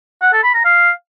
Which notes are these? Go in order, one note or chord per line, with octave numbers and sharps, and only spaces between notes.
F#5
A4
B5
A#5
F5